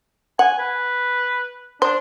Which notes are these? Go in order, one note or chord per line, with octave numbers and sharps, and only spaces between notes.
F#5 G#5
B4
D4 C5